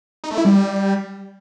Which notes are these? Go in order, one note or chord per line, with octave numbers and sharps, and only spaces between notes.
D#4
A3
E4
G3